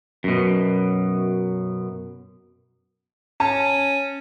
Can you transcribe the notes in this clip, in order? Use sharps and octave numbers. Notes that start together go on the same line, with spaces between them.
F#2 B2
C#4 A5